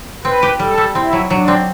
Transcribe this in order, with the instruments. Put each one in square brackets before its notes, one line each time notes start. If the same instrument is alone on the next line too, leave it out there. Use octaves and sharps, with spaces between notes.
[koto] C4 [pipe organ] B4
[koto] G4
[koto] G3 [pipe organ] A4
[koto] G3
[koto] C4 [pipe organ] E4
[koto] F#3
[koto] F#3 [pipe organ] D4
[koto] C4